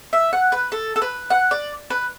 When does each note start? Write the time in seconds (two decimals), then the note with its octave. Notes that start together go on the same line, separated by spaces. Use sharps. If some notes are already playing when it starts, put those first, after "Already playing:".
0.13 E5
0.33 F#5
0.52 B4
0.72 A4
0.96 A4
1.02 B4
1.30 F#5
1.51 D5
1.90 B4